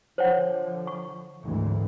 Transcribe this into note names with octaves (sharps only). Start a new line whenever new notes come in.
D3 F3 C5 C#5 F#5
C#6
G#1 D2 E3